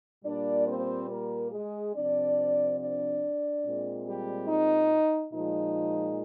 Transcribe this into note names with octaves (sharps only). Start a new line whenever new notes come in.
A#2 G3 A#3 D4 D5
C4 C5
A#3 A#4
G#3 G#4
C3 F3 C4 D4 D5
D4 D5
A#2 G#3 C4
G3 G4
D#4
A#2 F3 G#3 D#4